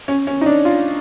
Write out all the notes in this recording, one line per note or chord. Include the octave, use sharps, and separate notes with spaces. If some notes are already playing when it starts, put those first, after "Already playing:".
C#4
C#4
D#4
D4
F4